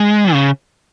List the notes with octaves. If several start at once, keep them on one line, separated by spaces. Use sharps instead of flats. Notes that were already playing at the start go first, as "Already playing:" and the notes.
Already playing: G#3
C#3